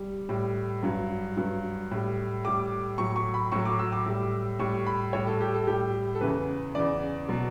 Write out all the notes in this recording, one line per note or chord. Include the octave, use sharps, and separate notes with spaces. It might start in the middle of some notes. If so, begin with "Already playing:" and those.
Already playing: G3
A2 G3
G2 F#3
G2 F#3
A2 G3
A2 G3 D6
A2 F#3 C#6
C#6
B5
A2 F#3 C#6
D6
E6
D6
A2 G3
A2 G3 C#6
B5
A2 G3 C#5
A4
G4
A4
A2 G3 G4
A4
E2 C#3 E3 B4
E2 C#3 E3 D5
B2 F#3